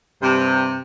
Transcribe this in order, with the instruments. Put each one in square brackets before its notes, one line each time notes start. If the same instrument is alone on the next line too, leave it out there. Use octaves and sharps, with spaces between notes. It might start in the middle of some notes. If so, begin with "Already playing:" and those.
[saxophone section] G2 C3